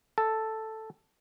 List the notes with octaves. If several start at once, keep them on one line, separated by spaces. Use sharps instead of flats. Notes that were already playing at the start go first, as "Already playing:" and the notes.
A4